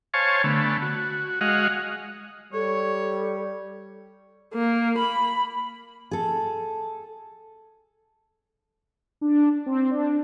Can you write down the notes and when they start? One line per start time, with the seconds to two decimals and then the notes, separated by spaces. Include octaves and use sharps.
0.14 C5 C#5 F5 G#5 A5 C#6
0.44 D3 A3 B3
0.82 F#4
1.41 G#3 F#4 D#5 F5 F#5
2.53 G3 A4 C#5
4.54 A#3
4.98 B5
6.11 G#4 A4
9.21 D4
9.66 C4
9.91 D4